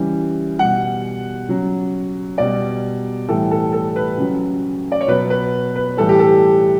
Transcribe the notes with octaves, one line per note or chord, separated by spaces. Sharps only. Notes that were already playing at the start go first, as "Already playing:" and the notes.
Already playing: C#3 E3 G3
B2 G3 F#5
C#3 F#3
B2 G3 D5
A2 E3 G3 A4
A4
A4
B4
C#3 F#3
D5
C#5
B2 F#3 B4
B4
B4
A2 E3 G3 A4
G4
A4